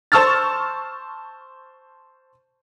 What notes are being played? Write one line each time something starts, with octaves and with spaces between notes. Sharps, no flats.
C5 A5 C#6 E6 F6 A6